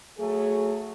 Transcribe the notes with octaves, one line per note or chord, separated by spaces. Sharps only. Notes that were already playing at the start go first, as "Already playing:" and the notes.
F#3 A3 G#4